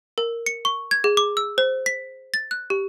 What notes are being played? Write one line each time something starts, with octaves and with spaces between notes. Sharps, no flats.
A#4
C#7
C#6
G#6
G#4
D6
E6
C5
B6
A6
F#6
G4